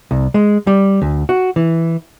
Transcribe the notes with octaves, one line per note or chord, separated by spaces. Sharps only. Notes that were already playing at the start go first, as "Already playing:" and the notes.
C2
G#3
G3
D2
F#4
E3